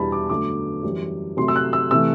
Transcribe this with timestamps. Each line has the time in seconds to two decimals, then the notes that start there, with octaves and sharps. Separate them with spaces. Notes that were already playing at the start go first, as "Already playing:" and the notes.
Already playing: E2 B2 G3 D4 A5 B5
0.12 D6
0.29 F#2 D3 F#3 A3 D6
0.83 F#2 E3 G3
1.37 C3 F#3 A3 C6
1.48 E6
1.56 F#6
1.73 E6
1.91 C3 E3 A3 E6